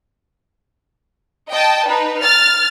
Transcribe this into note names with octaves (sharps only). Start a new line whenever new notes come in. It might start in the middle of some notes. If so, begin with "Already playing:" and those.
D#5 G5 A5
D#4 B4
F6 A6